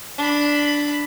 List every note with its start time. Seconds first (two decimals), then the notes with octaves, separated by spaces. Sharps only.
0.18 D4 B5